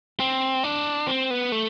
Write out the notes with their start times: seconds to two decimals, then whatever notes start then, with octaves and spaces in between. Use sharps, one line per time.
0.20 C4
0.64 D4
1.07 C4
1.30 B3
1.52 A3